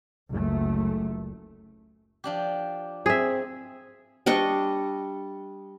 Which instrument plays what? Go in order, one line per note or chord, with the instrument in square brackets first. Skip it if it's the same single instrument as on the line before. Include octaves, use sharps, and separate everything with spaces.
[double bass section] F#1 C#2 A3
[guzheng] F3 D4 G4
[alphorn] C4 [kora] G#4 E5
[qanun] G3 D4 D#5 C#6